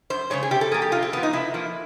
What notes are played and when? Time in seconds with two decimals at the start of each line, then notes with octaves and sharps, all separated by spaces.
0.10 F#2 C5
0.30 C#3 F3 G#3 C#5
0.43 G#4
0.51 C3 G4
0.61 A4
0.72 F3 A#3 G#4
0.82 G4
0.92 C3 F4
1.03 C4
1.12 F3 A#3 B3
1.23 D#4
1.33 C3 E4
1.54 F3 A#3